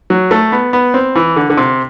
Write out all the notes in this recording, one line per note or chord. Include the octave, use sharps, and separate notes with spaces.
F#3
A3
B3
B3
C4
E3
D3
D3
C3